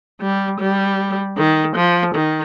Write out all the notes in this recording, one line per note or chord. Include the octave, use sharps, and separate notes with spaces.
G3
G3
D#3
F3
D#3